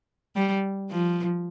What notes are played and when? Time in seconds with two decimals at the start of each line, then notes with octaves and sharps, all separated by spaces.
0.36 G3
0.91 F3